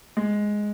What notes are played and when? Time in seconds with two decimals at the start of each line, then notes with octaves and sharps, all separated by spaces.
0.17 G#3